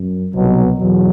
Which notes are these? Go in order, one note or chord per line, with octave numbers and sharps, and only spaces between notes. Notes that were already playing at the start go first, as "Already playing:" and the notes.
Already playing: F#2
C2 B2 F#3
E2 B2 F#3